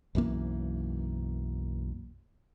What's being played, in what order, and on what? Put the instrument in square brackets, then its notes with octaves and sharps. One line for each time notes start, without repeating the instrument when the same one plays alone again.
[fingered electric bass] B1 F#2 E3 A#3